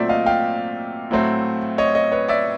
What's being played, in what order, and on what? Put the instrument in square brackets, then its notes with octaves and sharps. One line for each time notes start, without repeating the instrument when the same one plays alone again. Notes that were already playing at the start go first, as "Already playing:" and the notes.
Already playing: [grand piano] A#2 F#3 A3 C4 D5 E5
D#5 F5
F5 G5
A2 F#3 A3 C4
C#5 D#5
C#5 D#5
B4 C#5
D5 E5